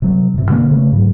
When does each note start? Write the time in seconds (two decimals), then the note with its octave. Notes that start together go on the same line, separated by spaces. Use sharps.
0.02 C3 F#3
0.34 G2 C3
0.49 B2 D3 F#3 A#3
0.71 C#3 A3
0.92 G#2 F#3